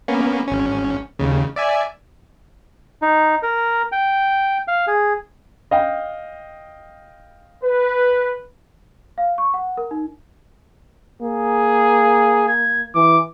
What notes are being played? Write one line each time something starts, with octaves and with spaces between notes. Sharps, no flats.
A#3 B3 C#4
G#1 C#4
D#2 C#3
D5 E5 G#5
D#4
A#4
G5
F5
G#4
D#5 F5 G5
B4
F5
C#6
F#5
A#4
D#4
A#3 G#4
G#6
E3 D6